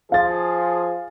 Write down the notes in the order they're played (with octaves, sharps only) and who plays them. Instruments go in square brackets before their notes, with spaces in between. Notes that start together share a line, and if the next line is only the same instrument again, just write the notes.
[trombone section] F3 G#4 [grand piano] F5 A6